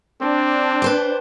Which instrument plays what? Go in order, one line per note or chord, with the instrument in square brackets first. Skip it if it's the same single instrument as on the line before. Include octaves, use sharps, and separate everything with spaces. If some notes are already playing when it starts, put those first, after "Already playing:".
[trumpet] C4 [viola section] D4
[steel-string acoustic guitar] B4 C5 G5